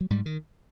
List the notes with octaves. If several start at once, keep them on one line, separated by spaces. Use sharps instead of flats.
F#3
G#2 G3
D#3